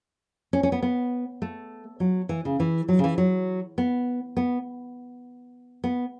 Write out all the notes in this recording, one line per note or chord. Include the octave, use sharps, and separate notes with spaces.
C#4
C#4
B3
B3
A3
F#3
E3
C#3
E3
F#3
C#3
E3
F#3
B3
B3
B3